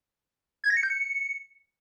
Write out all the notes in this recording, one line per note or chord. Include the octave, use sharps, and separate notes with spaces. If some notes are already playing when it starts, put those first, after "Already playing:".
G#6
A#6
C#7
G6
C#7